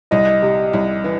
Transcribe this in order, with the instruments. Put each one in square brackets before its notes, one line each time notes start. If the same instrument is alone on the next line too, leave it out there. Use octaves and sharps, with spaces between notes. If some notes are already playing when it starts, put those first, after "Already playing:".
[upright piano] C2 [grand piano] D#5
[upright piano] C3
C2
E3